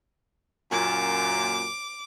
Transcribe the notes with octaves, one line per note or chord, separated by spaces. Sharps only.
F#2 A#2 D6